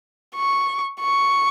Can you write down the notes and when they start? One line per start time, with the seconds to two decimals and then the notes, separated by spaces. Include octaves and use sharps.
0.36 C#6
1.00 C#6